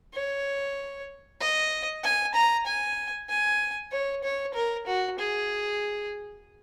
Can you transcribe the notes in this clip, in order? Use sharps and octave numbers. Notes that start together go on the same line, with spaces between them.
C#5
D#5
G#5
A#5
G#5
G#5
C#5
C#5
A#4
F#4
G#4